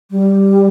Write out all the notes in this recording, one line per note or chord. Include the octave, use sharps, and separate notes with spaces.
G3